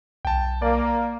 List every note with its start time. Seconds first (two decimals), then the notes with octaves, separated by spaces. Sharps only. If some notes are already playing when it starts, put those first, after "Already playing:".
0.25 B1 G5 A5
0.62 A#3 D5